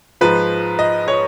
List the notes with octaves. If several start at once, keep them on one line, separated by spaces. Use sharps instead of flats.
G#2 F3 B4
D#5
C#5